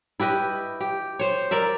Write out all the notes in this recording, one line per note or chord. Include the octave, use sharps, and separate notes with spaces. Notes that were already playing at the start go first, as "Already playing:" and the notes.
E4 G4 B4 D#5
G4
C5 C#5
A#4 D5 E5